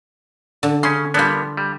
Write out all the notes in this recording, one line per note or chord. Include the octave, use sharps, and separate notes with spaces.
D3
C#3 C#4 C6
G3 A#3 B3 D4 F4
G3